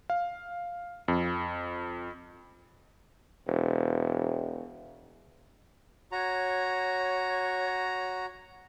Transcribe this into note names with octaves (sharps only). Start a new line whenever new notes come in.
F5
F2
E1
F#4 C#5 A#5